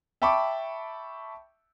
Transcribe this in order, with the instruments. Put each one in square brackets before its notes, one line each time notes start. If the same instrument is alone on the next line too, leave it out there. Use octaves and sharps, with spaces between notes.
[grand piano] E5 G5 A5 B5 C#6 D6